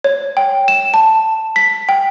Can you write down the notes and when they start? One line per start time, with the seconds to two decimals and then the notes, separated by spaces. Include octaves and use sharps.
0.04 C#5
0.37 G5
0.68 E7
0.94 A5
1.56 B6
1.89 G5